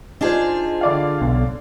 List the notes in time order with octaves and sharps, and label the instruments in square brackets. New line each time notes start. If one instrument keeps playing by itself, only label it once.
[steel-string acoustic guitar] D4 F4 G#4 [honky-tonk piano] D#4 C5
[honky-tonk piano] D3 D5 F5
[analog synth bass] B1